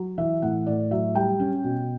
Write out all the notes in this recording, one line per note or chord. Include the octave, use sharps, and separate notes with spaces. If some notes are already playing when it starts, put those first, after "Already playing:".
Already playing: F#3
E3 E5
A2 F#5
A2 D5
F#3 E5
G3 G5
C#4
B2